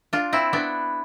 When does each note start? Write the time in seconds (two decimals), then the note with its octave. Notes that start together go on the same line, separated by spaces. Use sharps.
0.13 D4 F4
0.33 C4 E4
0.53 B3 D4